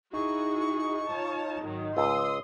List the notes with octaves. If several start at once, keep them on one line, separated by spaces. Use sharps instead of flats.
D#4 E4 F#4 G#4 C#6
F4 C#5 A5
G#1 D#3 F#3
C#2 C6 D#6 E6